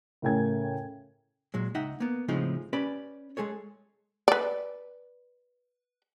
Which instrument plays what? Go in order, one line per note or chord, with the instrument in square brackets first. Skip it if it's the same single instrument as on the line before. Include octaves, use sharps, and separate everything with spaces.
[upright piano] A2 C#3 A#4 G5 G#5 G#6
[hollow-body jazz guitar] A#2 F#3 G#3
C#2 D#4 E5 F#5 G5
A#3 B3
A2 C#3 F3 G#3 C4 D#4
C#4 G4 B4 D5 B5
G#3 G#4 A4 C#5
[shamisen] B4 D5